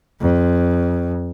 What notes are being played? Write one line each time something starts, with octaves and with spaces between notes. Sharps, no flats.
F2